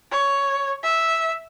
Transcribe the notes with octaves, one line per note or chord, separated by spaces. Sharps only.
C#5
E5